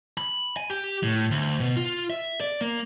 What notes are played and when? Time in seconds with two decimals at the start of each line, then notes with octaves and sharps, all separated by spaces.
0.18 B5
0.57 G#5
0.70 G4
1.03 A2
1.31 D2
1.60 B2
1.76 F4
2.10 E5
2.41 D5
2.61 A#3